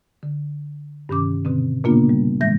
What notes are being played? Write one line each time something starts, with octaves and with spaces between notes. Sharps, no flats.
D3
G2 C3 D#3 C#4 D6
B2 D3 C4
A#2 C#3 A#3 B3 D4 F4
G3
A2 E3 G#3 E5 G6 A#6